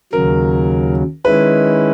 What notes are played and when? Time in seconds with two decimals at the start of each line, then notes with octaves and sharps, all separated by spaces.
0.13 D#2 C#3 F#3 A#4
1.25 D#3 G#3 C#4 E4 B4